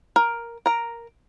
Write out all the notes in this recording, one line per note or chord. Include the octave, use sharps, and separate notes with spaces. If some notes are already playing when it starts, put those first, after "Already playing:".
A#4
A#4 A#5